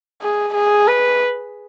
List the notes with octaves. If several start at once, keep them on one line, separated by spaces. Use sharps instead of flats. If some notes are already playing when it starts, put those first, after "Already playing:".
G#4
G#4
B4